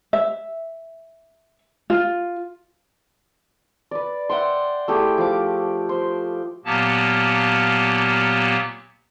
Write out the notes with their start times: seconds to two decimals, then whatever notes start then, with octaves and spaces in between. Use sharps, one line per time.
0.13 E5
1.90 F4
3.91 B4 D5
4.29 E5 F#5 G5 C6
4.88 A3 E4 G4 G#4
5.18 F3 D6
5.89 C5
6.65 A#2 F#3 A#3 B3 G4 A5